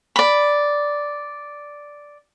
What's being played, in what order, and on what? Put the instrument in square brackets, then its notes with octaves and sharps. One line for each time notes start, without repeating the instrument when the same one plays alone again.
[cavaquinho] D5 B5